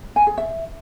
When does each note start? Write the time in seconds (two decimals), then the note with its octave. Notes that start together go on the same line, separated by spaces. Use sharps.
0.16 G#5
0.27 G#4
0.38 E5